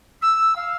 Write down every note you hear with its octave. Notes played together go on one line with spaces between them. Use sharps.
E6
F5